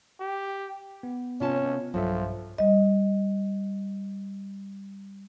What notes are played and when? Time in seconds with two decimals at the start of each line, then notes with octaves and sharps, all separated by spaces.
0.21 G4
1.03 B3
1.41 C3 C#4 F4 A5
1.94 B1 G2 F3 F#3 A4 E5
2.58 G3 D#5